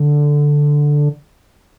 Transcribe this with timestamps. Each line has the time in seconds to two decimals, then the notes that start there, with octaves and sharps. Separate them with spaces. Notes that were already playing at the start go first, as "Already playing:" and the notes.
Already playing: D3